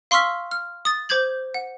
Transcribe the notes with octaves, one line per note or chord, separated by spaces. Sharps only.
F5 C6 C#6 E6 F6 B6
F6
D#6 A6
C5 D6 G6 G#6 F#7
F#5